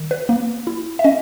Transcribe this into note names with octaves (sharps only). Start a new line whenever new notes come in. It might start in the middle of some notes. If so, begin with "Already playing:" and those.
Already playing: D#3
B4
A#3
E4
E5
C#4 D#5